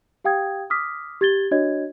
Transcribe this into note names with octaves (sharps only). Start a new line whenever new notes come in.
G4 F5 G5 D#6 G#6
D6 D#6 F6 B6
G4 G#6 A6 G7
D4 F#4 C#5 D#5 G#6